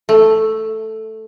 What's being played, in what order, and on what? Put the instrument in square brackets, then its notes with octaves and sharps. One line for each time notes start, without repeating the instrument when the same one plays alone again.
[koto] A3